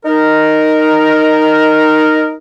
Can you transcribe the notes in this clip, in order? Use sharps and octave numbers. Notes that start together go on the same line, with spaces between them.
D#4 A#4